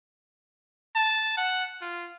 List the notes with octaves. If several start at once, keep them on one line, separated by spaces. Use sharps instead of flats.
A5
F#5
F4